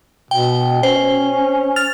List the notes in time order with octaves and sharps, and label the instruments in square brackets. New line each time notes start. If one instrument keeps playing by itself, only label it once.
[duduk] B2 [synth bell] G5
[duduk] C#4 [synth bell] C5
[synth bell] F6 A6 F7